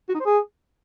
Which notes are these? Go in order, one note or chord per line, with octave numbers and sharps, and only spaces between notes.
F#4
D#4
C5
G#4